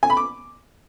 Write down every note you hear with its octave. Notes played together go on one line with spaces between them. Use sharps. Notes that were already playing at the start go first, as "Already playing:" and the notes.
G#5
B5
D6